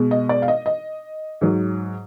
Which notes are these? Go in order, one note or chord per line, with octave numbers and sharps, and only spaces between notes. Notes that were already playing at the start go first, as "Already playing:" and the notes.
Already playing: B2 G#3
D#5
D5
F5
D#5
D#5
G#2 F#3